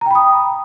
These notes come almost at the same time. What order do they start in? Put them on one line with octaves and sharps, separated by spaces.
A#5 G5 B5 D#6